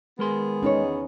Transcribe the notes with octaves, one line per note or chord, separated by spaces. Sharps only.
D#3 G#3 B3 G#4 A#4 C6
E2 C#4 D#4 C#5